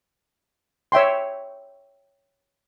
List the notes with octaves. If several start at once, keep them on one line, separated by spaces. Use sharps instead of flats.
C#5 E5 G5 C6